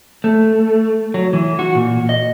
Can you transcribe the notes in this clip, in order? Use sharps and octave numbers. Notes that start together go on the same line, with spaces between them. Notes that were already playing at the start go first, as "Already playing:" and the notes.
A3
F#3
E3
F#4
A#2
D#5